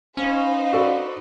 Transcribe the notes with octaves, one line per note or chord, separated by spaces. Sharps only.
C#4 D#4 B4 C5 F5
F#4 A4 D5